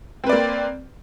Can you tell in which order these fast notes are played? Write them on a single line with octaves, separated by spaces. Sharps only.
C4 B4 D5 A#3